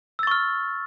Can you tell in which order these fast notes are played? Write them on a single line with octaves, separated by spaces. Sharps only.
E6 A6 C#6 F6